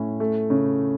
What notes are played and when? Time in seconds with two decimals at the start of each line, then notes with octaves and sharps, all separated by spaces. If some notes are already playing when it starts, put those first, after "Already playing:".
Already playing: A2 C#4
0.20 A3
0.50 C#3